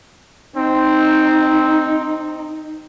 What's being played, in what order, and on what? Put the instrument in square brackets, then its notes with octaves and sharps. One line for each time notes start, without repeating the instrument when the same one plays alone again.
[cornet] C4 [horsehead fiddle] D#4